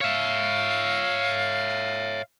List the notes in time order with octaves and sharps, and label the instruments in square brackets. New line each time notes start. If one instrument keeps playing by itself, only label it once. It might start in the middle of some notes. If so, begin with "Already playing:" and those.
[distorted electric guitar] C#5 E5 [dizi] F5